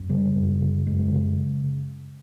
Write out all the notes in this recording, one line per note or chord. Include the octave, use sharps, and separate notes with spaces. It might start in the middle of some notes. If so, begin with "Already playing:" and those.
Already playing: F#2
C#3 G3
F#2
C#3
F#2 G#3
C#3